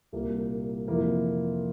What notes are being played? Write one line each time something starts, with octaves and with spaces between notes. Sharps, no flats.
C2 A#2 G3 A#3
F2 C3 E3 A#3 E4